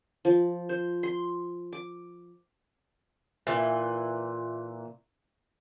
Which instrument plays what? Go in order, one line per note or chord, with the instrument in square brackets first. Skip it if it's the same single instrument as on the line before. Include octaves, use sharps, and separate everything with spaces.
[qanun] F3
C5
C6
D6
[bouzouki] A#2 E3